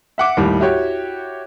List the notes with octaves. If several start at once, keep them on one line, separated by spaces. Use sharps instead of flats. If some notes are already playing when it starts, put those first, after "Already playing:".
E5 F#5 D6
D#2 A2 G3
E4 F#4 G4 C#5